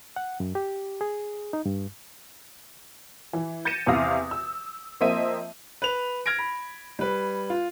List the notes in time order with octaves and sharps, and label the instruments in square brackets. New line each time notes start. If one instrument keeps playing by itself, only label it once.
[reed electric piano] F#5
F#2
G4
G#4
D#4
G2
[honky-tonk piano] E3
G6 A6 A#6 C#7 D#7 E7
E2 C3 E4 F5 D#6 A#6
E6
F3 A#3 C4 D#5 E5 D#7
[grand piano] B4 F7
F6 G#6 A#6 D7
B5
G3 B4
F4